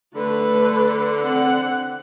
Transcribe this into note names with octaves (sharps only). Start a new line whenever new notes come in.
D3 A3 B4
C4 F#5